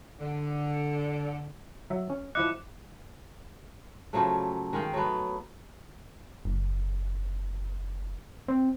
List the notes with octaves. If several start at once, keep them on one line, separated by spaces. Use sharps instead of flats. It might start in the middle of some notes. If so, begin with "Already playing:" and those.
D3
F#3 E5
C#4
F3 E4 D#5 D6 F#6 C#7
C#3 F3 F#3 A3
D#3 G#3 F5 G5
F#3 A3 B3
F#1
C4